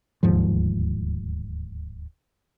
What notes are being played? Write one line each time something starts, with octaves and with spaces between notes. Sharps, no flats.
D1 D#2 G#2 F3